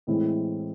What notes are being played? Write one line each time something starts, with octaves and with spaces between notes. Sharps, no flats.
A2 E3 G#3 C4 E4